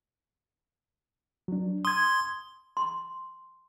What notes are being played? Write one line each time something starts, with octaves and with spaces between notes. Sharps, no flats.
F#3 D4
C6 D#6 G#6
C6